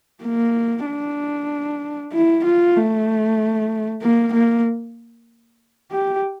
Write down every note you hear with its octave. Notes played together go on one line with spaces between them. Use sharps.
A#3
D4
E4
F4
A3
A#3
A#3
G4